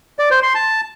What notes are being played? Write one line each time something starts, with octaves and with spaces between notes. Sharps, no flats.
D5
C5
C6
A5